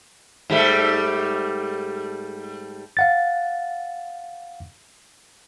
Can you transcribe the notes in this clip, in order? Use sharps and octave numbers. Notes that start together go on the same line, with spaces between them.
G#2 G3 A3
F5 F#5 A6